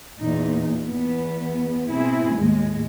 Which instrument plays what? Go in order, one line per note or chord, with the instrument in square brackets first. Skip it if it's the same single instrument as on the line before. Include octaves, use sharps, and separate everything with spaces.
[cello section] E2 A#2 D#4
E2 B3
B2 C4 E4 G#4
D#2 A2 G#3